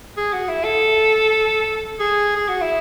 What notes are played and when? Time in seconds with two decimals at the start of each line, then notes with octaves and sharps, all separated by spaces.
0.17 G#4
0.33 F#4
0.49 E4
0.64 A4
1.99 G#4
2.36 G#4
2.48 F#4
2.61 E4